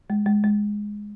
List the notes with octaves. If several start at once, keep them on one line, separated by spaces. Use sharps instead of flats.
G#3
G#3
G#3